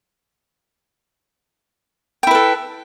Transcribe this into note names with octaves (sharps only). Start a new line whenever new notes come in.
E4 A4 B4 G5